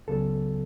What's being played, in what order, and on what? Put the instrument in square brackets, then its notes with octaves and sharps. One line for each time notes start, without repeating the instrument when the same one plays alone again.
[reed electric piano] C#2 C#3 F#3 B3 A4